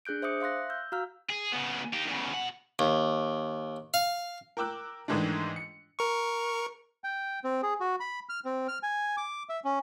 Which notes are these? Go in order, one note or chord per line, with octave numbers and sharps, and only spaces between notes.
D4 G#4 F#6 G6 D7
C5 E5 D6 D#6 C#7
E5 F5 C6 F#6 A#6
E6 G6
F#4 F5 A#5 E6 F6
G#4
C#3 B3
D#4 G4
E2 C#3
B2 F#5
D#2
F5
A#4 G5 D6 E6 F#6
G#2 D#3 E3 G#3 A3 D4
C#7
A#4 C#6
G5
C4
G#4
F#4
B5
F6
C4
F6
G#5
D6
E5
C#4